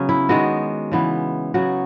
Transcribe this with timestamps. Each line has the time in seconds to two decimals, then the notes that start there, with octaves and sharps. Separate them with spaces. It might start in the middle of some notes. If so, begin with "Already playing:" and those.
Already playing: C#3 F#3 B3 C#4
0.09 E4
0.29 D#3 G#3 B3 F#4
0.92 C#3 E3 B3
1.54 C#3 F#3 B3 F#4